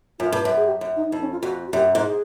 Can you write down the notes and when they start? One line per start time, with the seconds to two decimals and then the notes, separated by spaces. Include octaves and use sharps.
0.19 F#2 F4
0.32 G2
0.45 F#2
0.57 G#4
0.66 G4
0.81 F#2
0.96 D#4
1.12 F2 D#4
1.21 C#4
1.32 F4
1.42 F2 F#4
1.68 F#4
1.73 F#2 G4
1.95 G#2
2.04 G#4